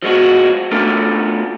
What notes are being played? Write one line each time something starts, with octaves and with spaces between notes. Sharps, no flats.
F3 G#3 B3 F#4
A3 B3 D4 F4 A4